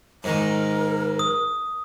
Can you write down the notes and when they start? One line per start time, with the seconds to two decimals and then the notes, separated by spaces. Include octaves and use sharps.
0.24 G#2 D#3 A#4
1.19 D#6